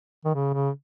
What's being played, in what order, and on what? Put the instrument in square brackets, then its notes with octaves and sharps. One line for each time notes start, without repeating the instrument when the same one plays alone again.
[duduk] D#3
C#3
C#3